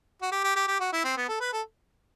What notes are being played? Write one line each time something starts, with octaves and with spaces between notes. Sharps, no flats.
F#4
G4
G4
G4
G4
F#4
E4
C4
B3
A4
B4
A4